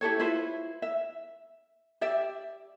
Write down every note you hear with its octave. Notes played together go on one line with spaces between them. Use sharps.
E4 G4 A4 C#5
E4 F4 B4 C5
E5
G4 D5 E5